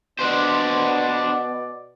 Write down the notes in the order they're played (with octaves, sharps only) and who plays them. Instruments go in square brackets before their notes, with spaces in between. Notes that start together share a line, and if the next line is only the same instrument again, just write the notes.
[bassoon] B2 [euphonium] B3 [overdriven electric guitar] D4 C5 [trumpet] D5